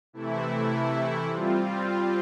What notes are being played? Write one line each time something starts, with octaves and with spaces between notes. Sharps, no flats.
C3 E3 A3 E4
G3 C4 F4